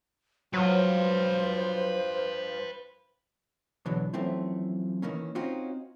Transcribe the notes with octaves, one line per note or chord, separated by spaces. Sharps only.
G2 F3 F#3 F4 B4 C5 F5
E2 B2 D3 E3 F#3
F#2 E3 F3 A3 C4 E4
D#3 E3 A#3 C#4
C4 C#4 D#4 F4 F#4